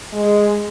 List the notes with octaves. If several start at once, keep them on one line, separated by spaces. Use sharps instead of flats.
G#3